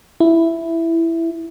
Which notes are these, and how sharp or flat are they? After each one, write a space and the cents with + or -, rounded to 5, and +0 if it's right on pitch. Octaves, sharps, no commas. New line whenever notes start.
E4 +5